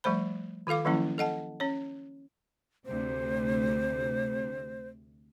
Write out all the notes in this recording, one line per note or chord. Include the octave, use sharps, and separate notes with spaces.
F3 G3 A3 C5 B5
D#3 F4 A4 F5 D6
D#3 F3 F#3 A#3 C#4 E4
A4 D#5 F#5 A5
C#4 C#5
D2 C3 C5